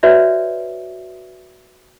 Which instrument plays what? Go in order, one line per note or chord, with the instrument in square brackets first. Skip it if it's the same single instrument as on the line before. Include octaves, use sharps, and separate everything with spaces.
[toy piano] F#4 B4 C#5 D5 E5